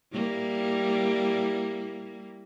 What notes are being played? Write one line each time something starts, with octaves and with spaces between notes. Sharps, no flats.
G3 A#3 E4